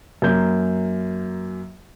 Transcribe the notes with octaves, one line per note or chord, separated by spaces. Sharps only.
F#2 A#3 G6